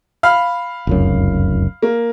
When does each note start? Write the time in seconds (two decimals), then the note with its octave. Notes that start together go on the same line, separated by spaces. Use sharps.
0.23 F5 B5 F6
0.87 F1 C#2 F#2
1.82 A#3